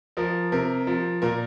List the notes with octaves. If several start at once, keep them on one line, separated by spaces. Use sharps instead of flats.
F3 A#4
C3 A#4
F3
A#2 A#4